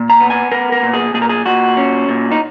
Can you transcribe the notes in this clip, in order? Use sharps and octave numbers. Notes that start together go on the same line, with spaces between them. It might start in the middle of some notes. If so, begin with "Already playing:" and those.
Already playing: A#2
A#5
B3
G#5
B3 A#4
A#4
A#2
G#4
A#2 G#4
A#4
G#4
A#2 F#4
C#4
A#2
D#4